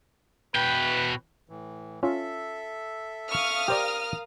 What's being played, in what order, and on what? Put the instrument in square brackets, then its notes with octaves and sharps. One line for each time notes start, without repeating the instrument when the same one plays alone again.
[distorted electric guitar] B2 G5 [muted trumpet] B4
[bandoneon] A2 E3
[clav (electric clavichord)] C#4 F4 [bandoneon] A4 E5
[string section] F5 D#6 F6 [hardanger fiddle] C#6
[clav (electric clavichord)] G4 C5 D5 [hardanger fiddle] A#4